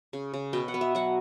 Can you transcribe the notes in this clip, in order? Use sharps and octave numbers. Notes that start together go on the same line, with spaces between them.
C#3
C#3
B2 G5
F#5
B3
E5
F#3 F#5